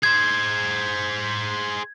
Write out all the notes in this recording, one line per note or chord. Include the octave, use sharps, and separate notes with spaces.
G#4 C5 G#6